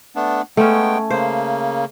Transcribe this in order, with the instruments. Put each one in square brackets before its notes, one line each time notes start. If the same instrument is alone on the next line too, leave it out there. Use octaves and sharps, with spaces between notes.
[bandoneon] A3 B3 D4
[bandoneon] G#3 B3 G5 [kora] A3 C#4
[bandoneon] C#3 A#3 [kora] C5